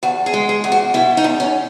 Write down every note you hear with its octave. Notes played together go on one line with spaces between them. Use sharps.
E2 F#4
G#4
G#3
G#4
E2
F#4
B2 E4
D#4
E2
C#4